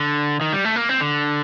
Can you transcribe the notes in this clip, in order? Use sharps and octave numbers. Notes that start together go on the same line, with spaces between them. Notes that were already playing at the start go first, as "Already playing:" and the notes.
Already playing: D3
D#3
G3
A3
A#3
C4
D3